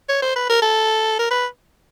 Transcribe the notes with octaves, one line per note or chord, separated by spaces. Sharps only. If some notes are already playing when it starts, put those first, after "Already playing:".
C#5
C5
B4
A#4
A4
A#4
B4